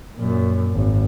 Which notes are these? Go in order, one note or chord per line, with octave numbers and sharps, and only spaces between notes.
F#2 A#2
G#1